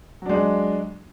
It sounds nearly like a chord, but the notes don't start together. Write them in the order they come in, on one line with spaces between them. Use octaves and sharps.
F#3 D4 G#3